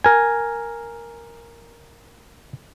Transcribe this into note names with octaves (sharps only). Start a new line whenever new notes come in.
A#4 G#5